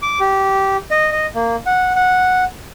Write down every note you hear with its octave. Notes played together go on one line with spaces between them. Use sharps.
D6
G4
D#5
D#5
A#3
F#5
F#5